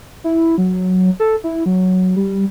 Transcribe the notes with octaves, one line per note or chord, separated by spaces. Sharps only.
E4
F#3
A4
E4
F#3
G3